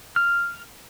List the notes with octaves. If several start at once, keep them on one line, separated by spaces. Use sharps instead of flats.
F6